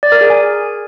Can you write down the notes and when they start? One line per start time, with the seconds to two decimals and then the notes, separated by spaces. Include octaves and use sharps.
0.03 D5
0.12 A#4
0.21 G#4
0.30 G#5